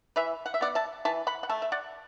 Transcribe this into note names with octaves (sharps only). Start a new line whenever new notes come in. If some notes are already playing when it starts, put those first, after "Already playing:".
E3 B4 E5
F#5
E5
B3 D5 F#5
E5 A5
E3 E5 A5
F#5 B5
F#5
A3 E5 A5
E5
D5 F#5